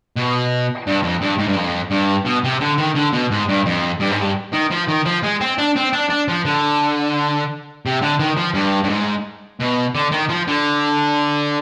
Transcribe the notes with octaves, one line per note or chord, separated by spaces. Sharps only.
B2
G2
F2
G2
G#2
G2
F2
G2
B2
C3
D3
D#3
D3
B2
G#2
G2
F2
G2
G#2
G2
D#3
F3
D#3
F3
G#3
C4
D4
C4
D4
D4
F3
D3
C3
D3
D#3
F3
G2
G2
G#2
B2
D3
D#3
F3
D3